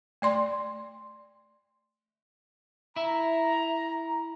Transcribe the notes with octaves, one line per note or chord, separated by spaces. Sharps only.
A3 D5 C6
E4 E5 A#5